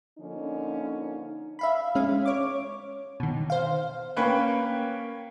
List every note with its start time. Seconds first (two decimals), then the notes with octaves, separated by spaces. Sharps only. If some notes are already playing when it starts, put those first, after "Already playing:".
0.19 D3 F3 A#3 C#4 D#4
1.59 E5 F5 B5
1.95 G#3 C#4 F5
2.25 C#5 D6
3.20 B2 D#3
3.50 C5 F5
4.16 A#3 C#4 B4 G5 B5 F#6